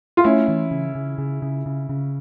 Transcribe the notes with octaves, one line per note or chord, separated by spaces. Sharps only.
F4
A3 C#4 E4
E3
C#3
C#3
C#3
C#3
C#3
C#3